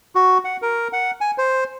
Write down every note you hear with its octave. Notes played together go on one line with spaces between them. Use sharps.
F#4
F#5
A#4
F#5
G#5
C5